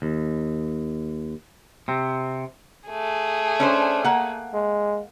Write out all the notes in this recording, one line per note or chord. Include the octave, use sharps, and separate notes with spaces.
D#2
C3 C4
A3 G#4
C#4 D4 C5
A#3 F#5
G#3